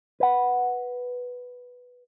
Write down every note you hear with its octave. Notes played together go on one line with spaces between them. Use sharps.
B4 F#5